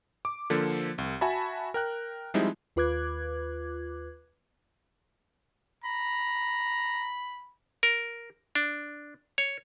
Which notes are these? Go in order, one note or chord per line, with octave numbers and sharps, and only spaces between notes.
D6
D3 F3 A#3 A4 C5
C2
F#4 E5 G#5 A5 B5
A#4 G5 F#6
F3 G3 G#3 C4 D#4 E4
D#2 F4 B4 D6 F#6 G#6
A#5 B5
A#4
D4
C#5